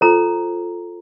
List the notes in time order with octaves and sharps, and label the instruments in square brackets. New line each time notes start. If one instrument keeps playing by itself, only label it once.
[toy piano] F4 A4 C5 A#5